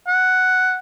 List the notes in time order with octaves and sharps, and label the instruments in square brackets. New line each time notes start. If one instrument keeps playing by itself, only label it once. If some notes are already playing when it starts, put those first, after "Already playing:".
[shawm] F#5